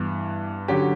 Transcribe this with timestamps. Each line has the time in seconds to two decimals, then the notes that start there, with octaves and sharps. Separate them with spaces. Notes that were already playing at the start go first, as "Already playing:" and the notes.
Already playing: G2 E3 B3
0.68 D3 F#3 C#4 G4